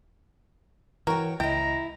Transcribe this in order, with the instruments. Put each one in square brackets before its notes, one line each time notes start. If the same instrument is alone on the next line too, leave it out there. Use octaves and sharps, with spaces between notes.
[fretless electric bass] E3 [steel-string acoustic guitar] F#4 C#5 G5 [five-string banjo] A#4
[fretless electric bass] C#2 [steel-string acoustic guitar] E4 D#5 [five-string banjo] G5 [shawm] A#5